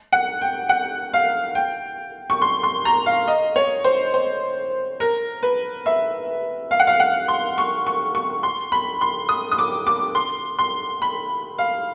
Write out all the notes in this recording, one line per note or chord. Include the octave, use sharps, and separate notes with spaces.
F#5
G5
F#5
F5
G5
C#6
C6
C6
A#5
F5
D#5
C#5
C5
C5
A#4
B4
E5
F5
F#5
F5
F#5
C6
C#6
C#6
C#6
C6
B5
C6
D#6
D#6
D6
D6
C6
C6
B5
F5